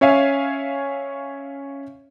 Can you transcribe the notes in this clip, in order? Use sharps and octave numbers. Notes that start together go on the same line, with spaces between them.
C#4 C#5 E5 F5 G#5